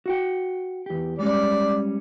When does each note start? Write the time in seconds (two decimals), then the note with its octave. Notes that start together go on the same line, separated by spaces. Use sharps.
0.06 F#4 F#5 G5
0.86 E2 G4
1.19 G3 G#3 C#4 D5